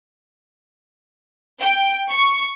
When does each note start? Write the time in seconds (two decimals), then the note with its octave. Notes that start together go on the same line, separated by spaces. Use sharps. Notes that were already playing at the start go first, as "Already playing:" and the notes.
1.60 G5
2.09 C#6